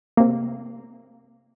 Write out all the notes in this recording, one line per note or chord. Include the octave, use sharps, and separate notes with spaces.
C3 A#3